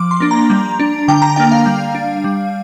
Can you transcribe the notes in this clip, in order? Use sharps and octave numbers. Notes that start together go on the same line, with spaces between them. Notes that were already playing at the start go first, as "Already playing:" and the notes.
Already playing: F3 D6
C6
A#3 D4
A#5
G3
D4
D3 G5
A#5
A#3 D4 G5
F5
G3
D4
G3